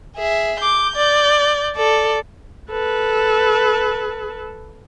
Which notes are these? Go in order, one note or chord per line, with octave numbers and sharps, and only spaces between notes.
G#4 E5
D6 G6
D5
A4 D5
A4 B4